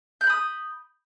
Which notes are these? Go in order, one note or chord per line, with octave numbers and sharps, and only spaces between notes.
B5 D#6 F#6 G6